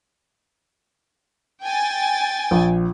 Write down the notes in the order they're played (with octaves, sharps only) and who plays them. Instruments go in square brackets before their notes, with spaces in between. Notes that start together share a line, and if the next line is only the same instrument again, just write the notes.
[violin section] G5 G#5 A6
[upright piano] A#1